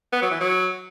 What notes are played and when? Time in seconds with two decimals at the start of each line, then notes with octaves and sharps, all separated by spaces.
0.13 B3
0.22 F#3
0.31 E3
0.40 F#3